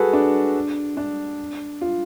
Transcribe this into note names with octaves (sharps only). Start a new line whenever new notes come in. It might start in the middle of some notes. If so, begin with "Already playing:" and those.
Already playing: F#4 G#4 A4 B4
D4
D4
F4